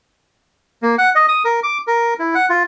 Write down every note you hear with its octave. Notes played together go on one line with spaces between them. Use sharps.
A#3
F#5
D#5
D#6
A#4
D6
A#4
E4
F#5
F4